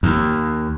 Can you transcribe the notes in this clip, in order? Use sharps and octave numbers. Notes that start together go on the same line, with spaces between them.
D#2